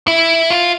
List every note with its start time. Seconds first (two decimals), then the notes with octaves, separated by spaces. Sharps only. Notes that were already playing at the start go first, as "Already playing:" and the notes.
0.08 E4
0.50 F4